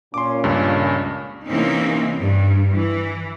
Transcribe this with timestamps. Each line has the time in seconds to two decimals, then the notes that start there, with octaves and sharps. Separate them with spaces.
0.14 A#2 C#4 C6 D6
0.44 C#2 G2
1.49 C3 E3 A#3 C4 C#4 D#4
2.21 G2
2.73 E3